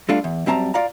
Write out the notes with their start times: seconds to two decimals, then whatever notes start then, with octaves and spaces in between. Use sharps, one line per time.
0.09 G3 A3 D4 F4
0.24 E2
0.46 F#2 G3 C4 A5 A#5
0.74 F4 D5 F5 A#5